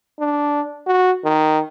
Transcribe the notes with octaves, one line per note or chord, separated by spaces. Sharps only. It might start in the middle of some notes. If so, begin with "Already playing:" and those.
D4
F#4
D#3